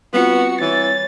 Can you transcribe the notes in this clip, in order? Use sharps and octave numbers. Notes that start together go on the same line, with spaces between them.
G3 B3 C4 F4 F#4 C#7
E3 C#5 A6